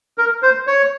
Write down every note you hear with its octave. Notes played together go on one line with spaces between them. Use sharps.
A#4
C5
C#5